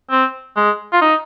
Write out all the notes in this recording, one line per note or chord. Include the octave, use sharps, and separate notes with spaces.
C4
G#3
F4
D#4